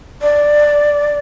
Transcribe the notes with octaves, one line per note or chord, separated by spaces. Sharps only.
D5